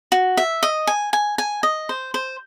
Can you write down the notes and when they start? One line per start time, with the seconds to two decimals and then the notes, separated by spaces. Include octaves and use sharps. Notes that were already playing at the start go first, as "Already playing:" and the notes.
0.12 F#4
0.37 E5
0.63 D#5
0.87 G#5
1.13 G#5
1.38 G#5
1.63 D#5
1.89 C5
2.14 C5